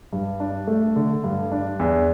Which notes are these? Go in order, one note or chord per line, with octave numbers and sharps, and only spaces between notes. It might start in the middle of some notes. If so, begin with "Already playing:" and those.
G2
D4
A3
D3
G2
D4
E2